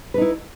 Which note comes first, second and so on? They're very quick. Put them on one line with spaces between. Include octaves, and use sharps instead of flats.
B4 D#4 E4